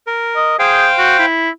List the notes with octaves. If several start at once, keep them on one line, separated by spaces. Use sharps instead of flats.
A#4
D#5
G#4 C5 F5 G5
F#4
E4